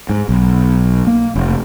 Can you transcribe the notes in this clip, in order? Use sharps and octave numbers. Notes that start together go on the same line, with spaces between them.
G#2
B1
A#3
F1